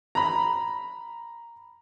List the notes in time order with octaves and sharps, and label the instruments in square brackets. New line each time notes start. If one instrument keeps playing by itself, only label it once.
[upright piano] A#5 B5